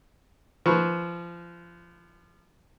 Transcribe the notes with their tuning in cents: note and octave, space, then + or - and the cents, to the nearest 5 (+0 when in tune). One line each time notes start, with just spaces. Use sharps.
F3 -25 B4 -30 C#6 -10